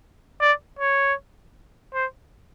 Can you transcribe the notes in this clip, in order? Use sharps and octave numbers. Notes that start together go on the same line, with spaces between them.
D5
C#5
C5